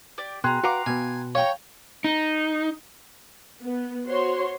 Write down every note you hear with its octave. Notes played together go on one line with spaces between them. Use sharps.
G4 D5
B2 G#4 G5 A#5 C6 F#6
F#4 B4 F5 F#5 A#5 D6
B2 B3 G#5
C#5 F5 G5 A#5 C#6
D#4
B3
F#4 C5 C#5 C6